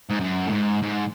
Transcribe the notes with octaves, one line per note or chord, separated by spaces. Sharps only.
G#2
F#2
A2
G#2
G#2